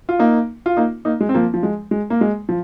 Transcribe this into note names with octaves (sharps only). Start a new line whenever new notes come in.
F4
A#3 D#4
F4
A#3 D#4
A#3 D#4
G#3
C4
F3 A#3
F3
G#3
G#3
A#3
G#3
F3